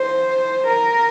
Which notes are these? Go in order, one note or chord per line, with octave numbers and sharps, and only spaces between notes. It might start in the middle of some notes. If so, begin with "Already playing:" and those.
Already playing: C5
A#4